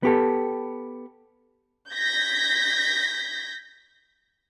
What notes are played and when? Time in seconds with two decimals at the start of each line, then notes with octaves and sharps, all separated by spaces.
0.03 B3 G4 A4
1.90 G6 G#6 A#6 B6